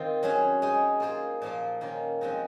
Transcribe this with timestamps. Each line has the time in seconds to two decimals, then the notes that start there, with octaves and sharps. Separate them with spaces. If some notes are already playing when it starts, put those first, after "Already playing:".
Already playing: D#3 C4 F4
0.23 F#3 C#4 G#4 C5
0.62 G#3 D#4 G#4
1.00 A#3 F4 G#4 C5
1.42 A#2 F3 A#3 F4
1.81 D#3 A#3 C#4 F4
2.21 F3 G#3 C4 D#4 F#4